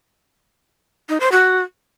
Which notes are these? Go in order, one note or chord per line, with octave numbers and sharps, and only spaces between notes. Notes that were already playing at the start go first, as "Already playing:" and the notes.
D#4
C5
F#4